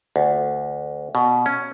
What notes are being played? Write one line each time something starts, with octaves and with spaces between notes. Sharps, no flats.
D2
B2
C#4